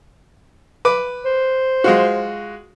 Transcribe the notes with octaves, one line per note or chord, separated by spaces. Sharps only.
B4 D6
C5
G#3 F4 F#4